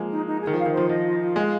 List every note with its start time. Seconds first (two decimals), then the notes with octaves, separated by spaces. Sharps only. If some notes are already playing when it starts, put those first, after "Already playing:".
Already playing: F3 G#3 A#3
0.11 D#4
0.26 D#4
0.41 G#4
0.47 D#3
0.53 F3
0.58 F5
0.66 D#3
0.73 F3 C5
0.89 F3 D#5
1.04 F4
1.20 F4
1.36 G#3 F5